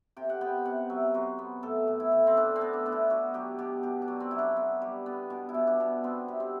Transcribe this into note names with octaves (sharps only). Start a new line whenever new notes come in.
C3 G5
F#5
B3 G5
C3 F#5
F#3 E5
F#3 C5
B3
A2 A4
A2
E4
A2
C4
A2 D4
C4
B3
D4
B3 D4
E4
B3 F#4
F#3 G4
B2 G4
B2 G4
D4
F#3
C4
F#3 E4
D4
B3
G3
B3
B2
E4
B2
D4
B2
B3 C4
C3
C4